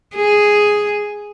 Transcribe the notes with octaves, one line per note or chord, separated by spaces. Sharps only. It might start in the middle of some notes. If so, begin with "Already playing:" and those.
G#4